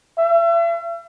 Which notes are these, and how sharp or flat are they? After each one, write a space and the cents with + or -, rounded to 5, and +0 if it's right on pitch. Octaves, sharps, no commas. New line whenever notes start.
E5 +40